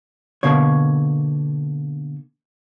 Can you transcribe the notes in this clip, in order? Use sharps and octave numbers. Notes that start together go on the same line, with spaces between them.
B2 D3 A#3 C#5